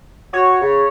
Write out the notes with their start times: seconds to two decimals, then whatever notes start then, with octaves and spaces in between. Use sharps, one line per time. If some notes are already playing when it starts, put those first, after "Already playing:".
0.33 F#4 C#5
0.61 C#3